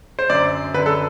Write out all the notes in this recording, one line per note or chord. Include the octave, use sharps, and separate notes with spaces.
C5
F#2 D3 D5
F#2 D3 B4
A4